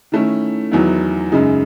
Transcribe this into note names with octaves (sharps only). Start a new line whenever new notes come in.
D#3 A3 C#4 E4
E2 D#3 F#3 B3 E4
F#2 C#3 G#3 D#4